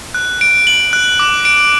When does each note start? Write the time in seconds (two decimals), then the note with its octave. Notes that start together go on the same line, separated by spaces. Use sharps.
0.14 F#6
0.41 D7
0.67 F#7
0.93 F#6
1.19 D6
1.45 D7